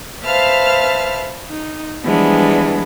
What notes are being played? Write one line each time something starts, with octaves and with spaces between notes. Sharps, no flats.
B4 C5 E5 F5 A5 F6
D#4
E3 F3 G3 G#3 B3 D4